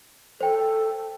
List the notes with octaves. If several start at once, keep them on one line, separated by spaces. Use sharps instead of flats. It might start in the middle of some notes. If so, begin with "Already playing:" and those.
A4 C5 G5